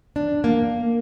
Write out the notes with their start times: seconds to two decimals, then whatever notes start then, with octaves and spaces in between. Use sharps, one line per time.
0.16 D4
0.44 A#3